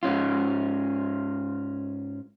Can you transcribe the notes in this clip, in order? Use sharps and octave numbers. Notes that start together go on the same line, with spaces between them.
G#2 C#4 F4